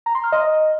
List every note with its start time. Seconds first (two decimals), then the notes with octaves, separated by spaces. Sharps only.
0.06 A#5
0.15 C6
0.24 F6
0.32 D#5